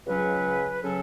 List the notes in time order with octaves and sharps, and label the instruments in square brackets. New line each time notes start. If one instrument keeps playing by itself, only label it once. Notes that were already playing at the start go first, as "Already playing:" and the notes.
[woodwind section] C#2 C#3 F#3 C#4 B4
C#3 F#3 C#4 A4